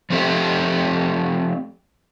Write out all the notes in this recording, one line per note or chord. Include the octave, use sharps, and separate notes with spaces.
F3 A3 C4 G4 A4 E5